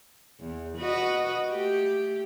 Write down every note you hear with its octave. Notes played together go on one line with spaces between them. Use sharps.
E2
F#4 B4 D#5
A3 G4